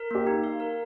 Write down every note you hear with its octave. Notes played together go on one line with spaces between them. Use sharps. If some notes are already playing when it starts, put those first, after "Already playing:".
Already playing: A#4
A#3 G4
D#4
F5
A#4